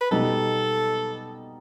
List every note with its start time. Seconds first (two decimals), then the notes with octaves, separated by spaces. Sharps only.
0.01 B4
0.11 B2 G3 B3 D#4 A4